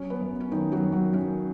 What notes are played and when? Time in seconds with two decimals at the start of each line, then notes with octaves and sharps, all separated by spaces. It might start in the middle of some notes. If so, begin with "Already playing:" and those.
Already playing: F#3 C#4 C#5
0.10 B3 B4
0.21 F#2
0.40 C#4
0.51 F#2 D#3 D#4
0.72 F#3 F#4
0.82 F#2
0.92 F#3 F#4
1.13 F#2 C#4